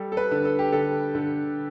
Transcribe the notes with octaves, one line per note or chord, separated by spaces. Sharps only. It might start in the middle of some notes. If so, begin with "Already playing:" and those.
Already playing: G3 A4
A4
B4
D3
A4
G4
D3 A4
D3